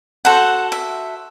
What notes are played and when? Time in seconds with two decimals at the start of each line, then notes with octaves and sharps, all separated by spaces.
0.25 F#4 A4 C5 F#5
0.72 E5